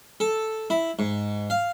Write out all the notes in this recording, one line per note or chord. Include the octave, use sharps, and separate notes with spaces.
A4
E4
G#2
F5